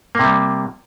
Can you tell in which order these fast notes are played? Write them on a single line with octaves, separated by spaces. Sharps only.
A#3 C3 G3